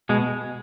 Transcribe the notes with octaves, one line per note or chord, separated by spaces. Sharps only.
B2 G#3